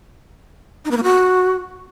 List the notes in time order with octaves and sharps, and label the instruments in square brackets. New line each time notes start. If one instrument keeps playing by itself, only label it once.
[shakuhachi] D#4
B3
A#3
F#4